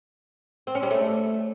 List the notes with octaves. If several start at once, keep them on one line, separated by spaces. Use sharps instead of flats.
C4
C#4
G3
A3